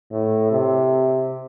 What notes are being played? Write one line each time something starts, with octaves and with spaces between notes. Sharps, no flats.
A2
C3